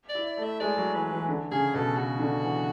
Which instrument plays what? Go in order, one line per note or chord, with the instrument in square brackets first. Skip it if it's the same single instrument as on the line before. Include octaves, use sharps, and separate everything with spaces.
[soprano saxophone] D5
[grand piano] E4
[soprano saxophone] D5
[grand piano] A3
[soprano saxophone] E5
[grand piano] G#3 [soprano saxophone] D5
[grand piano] F#3
[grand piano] E3 [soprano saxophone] B4
[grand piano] E3
D3
[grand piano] C#3 [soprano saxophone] G#4
[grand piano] B2 [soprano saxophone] A4
[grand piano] C#3 [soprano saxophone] F#4
[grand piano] D3
E3